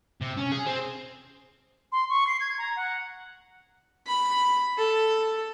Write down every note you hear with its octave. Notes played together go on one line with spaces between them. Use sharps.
C3
C#4
G#4
C4
C6
C#6
C7
G#6
A#5
F#5
B5
A4